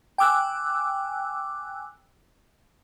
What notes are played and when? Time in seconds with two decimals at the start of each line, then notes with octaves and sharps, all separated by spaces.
0.18 G5 G#5 D6 E6 F#6